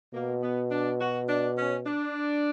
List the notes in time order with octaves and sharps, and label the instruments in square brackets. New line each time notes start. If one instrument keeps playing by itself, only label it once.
[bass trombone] B2 [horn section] A#3
[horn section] B3
D4
F#4
D4
C#4
D4